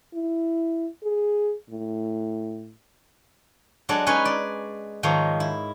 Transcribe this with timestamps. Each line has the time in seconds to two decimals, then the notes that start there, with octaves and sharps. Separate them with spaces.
0.14 E4
1.03 G#4
1.70 A2
3.89 F#3 G#3 D4 A4 D5
4.07 C#4 D#4 G#4 B4 C#5
4.25 D5
5.03 G#2 D#3 F3 C#5 A#5
5.40 E4